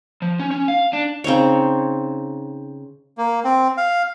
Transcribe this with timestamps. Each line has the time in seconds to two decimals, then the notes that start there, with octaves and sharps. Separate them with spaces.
0.22 F3
0.40 C#4
0.51 C#4
0.68 F5
0.93 D4
1.24 C#3 C4 D#4 C#5
3.18 A#3
3.44 C4
3.77 F5